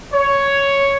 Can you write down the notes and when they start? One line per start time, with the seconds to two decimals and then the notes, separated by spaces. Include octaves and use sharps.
0.14 C#5